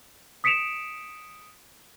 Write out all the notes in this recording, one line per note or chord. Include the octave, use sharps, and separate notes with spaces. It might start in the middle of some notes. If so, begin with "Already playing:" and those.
D#6 B6 C#7 D7 E7 F7